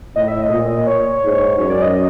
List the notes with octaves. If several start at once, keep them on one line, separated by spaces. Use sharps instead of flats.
A2 D#5
E5
D#5
A#2
C#5
G#2
F#2 C#5
D5
D#5